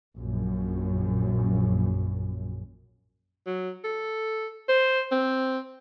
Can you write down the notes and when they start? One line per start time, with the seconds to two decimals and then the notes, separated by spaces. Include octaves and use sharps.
0.17 A#1 F#2
3.47 F#3
3.84 A4
4.69 C5
5.11 C4